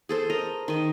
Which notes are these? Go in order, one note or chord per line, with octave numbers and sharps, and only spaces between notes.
G#4 A4 C5
A#4 D#5 A#5
D#3 D#5